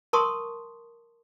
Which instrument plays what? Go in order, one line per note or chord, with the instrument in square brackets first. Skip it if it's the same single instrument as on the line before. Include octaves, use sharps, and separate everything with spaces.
[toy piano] A#4 A5 C6 C#6 D#6